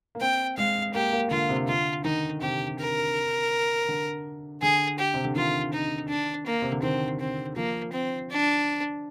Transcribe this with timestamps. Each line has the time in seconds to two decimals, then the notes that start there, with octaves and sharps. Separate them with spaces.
0.15 A#3
0.21 C4 G5
0.57 G#3 F5
0.94 A#3 G4
1.13 A#3
1.30 D3 F4
1.49 C3
1.68 D3 F4
2.04 D#3 D#4
2.41 C3 G4
2.79 A#4
3.89 D3
4.62 D3 G#4
4.98 G4
5.14 C3
5.25 D3
5.36 D#3 F4
5.73 D#4
6.09 D4
6.46 A#3
6.62 C3
6.72 D3
6.82 D#3 C4
7.20 C4
7.56 F3 A#3
7.93 C4
8.30 D4